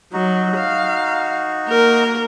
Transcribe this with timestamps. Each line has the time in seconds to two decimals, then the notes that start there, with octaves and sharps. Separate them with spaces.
0.13 F#3 D#4 F#4
0.57 F5
1.67 A#3 A#4